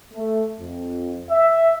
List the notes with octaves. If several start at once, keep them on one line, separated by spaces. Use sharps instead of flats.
A3
F2
E5